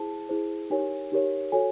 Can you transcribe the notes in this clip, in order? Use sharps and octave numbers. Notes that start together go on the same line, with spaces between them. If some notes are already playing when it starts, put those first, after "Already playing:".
Already playing: E4 G#4 C5 A5
E4 G#4 C5
D#4 G4 A#4 C#5 G#5
D#4 G4 A#4 C#5
F#4 A4 C#5 G#5